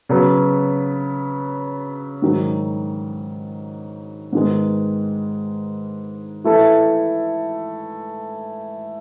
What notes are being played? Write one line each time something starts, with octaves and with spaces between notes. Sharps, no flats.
C#3 F#3 B3
G#2 D#3 F#3
G#2 D#3 G#3 B3
E3 A3 E4 A4